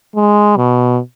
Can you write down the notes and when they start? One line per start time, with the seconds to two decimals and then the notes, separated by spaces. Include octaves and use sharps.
0.16 G#3
0.56 B2